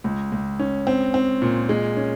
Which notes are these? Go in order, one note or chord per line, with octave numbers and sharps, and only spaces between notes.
C#2
C#2
C#4
C4
C4
A#2
G#3
C#4